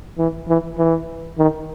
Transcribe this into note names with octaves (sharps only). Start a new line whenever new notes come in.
E3
E3
E3
D#3